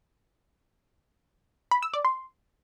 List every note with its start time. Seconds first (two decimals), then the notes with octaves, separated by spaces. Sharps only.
1.71 B5
1.83 E6
1.94 D5
2.05 C6